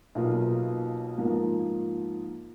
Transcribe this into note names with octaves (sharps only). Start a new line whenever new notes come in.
B1 B2 A#3 F4
G#2 F3 A#3